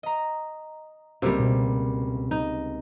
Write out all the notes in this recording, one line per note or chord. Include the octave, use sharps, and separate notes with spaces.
D#5 A#5
C#2 C3 G3 A#3
B2
D#4